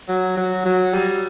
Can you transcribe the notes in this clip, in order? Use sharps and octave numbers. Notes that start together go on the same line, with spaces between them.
F#3
F#3
F#3
G3